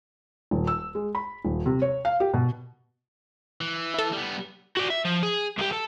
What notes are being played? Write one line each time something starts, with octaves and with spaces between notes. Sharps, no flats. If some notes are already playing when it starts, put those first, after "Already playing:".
D#1
E6
G#3
B5
D#1
C3
C#5
F5
G4
B2
E3
E4 A4
G3 B3
F#4 D5
E5
F3
G#4
C2 G4
A4